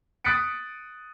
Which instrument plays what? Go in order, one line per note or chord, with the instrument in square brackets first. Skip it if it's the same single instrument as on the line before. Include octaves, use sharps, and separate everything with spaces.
[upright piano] D#6 F#6 A6 B6 C#7 D7